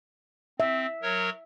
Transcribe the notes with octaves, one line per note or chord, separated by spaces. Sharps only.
C4 E5
F#3 A#4 C#5